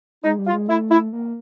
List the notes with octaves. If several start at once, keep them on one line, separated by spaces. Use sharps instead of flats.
G#3 D#4
G3
F4
G#3
A3 E4
E4
A#3